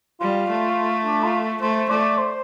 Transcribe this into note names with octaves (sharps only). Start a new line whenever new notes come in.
G3 F4
A3
D4
F4
A3 C5
A3 D5
C5